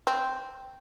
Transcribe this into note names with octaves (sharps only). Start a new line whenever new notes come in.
C4